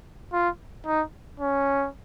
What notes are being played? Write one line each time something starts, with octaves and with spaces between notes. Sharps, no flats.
F4
D#4
C#4